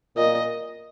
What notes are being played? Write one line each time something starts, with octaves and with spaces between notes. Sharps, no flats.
A#2 D#5